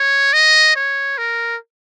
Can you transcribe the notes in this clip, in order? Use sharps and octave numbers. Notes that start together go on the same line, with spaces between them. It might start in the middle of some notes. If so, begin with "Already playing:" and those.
Already playing: C#5
D#5
C#5
A#4